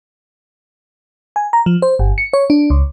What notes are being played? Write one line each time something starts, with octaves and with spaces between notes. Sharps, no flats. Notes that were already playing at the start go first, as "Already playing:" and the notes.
G#5
A#5
F3
C5
G1
C#7
C#5
D4
C#2